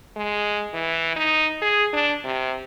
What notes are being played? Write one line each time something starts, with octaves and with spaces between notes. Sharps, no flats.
G#3
E3
D#4
G#4
D4
C3